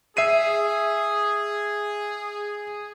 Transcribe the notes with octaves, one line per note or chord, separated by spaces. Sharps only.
G#4 E5 C7 D#7